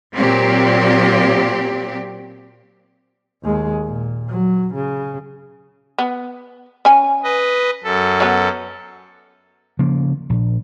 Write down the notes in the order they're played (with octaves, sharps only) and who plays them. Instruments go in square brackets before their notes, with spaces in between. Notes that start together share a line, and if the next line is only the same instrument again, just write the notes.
[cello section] A#2 F#3 C4 G4
[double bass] D#2 G#3
A#2
F#3
C#3
[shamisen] B3
C#4 G#5
[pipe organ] B4 D#5
F#2 A4
[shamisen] F#3 B3
[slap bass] C#3 F3 A#3
A#1